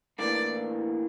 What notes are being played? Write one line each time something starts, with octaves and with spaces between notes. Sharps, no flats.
A2 E3 A#3 D4 D5